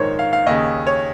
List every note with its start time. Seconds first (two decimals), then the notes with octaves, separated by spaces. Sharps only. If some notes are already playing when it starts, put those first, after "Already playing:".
Already playing: A#1 G#2 D#3 A#4 C5 C#5
0.19 F5
0.33 F5
0.47 D#2 C#3 D#5
0.87 C#5